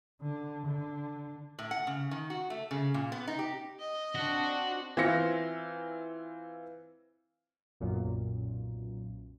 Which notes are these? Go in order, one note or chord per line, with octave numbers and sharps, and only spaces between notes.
D3
D3
A2
F#5
C#3
D#3
F#4
A3
C#3
A#2
B3
D#4
G4
D#5
C4 D4 F#4
E3 C4 E4 F4 A#6 C#7
B1 F#2 A#2